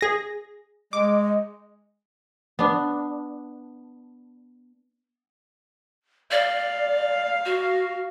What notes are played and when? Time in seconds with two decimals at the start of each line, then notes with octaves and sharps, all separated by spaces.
0.01 G#4 A#6
0.93 G#3 D#5 D6
2.59 B3 D4
6.31 D5 F5
7.45 F#4